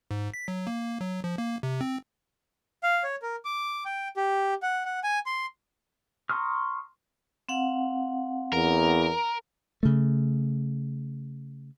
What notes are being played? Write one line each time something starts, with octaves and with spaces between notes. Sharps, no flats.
G#2
B6
F#3
A#3
F#3
F3
A#3
C3
C4
F5
C#5
A#4
D6
G5
G4
F#5
F#5
G#5
C6
A#5 C6 C#6 D#6 F6
C4 F5 F#5
E2 A#4
C#3 A3